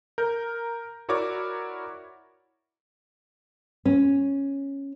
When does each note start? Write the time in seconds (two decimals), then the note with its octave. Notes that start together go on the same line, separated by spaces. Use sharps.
0.18 A#4 G6
1.09 E4 F#4 A#4 C#5 D5 D6
3.85 C#4